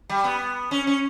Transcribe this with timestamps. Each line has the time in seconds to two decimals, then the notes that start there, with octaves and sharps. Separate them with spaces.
0.09 G3
0.24 B3
0.71 C#4
0.87 C#4